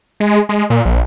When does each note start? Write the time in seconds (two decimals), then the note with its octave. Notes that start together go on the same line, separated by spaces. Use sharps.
0.20 G#3
0.49 G#3
0.70 A#2
0.85 A#1